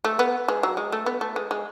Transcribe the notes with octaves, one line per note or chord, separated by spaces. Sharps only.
A3
B3
G#3
F#3
G#3
A3
B3
A3
G#3
G#3